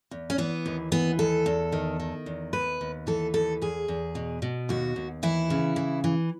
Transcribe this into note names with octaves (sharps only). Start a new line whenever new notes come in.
E2
C#4
E3 B3
D#2
E3 B3
D#2 A4
E2
D#3
D#3
E2
D#2 B4
D#2
E3 A4
D#2 A4
E2 G#4
E2
B2
B2
D#2 F#4
D#2
E3 E4
C#3
E3
E3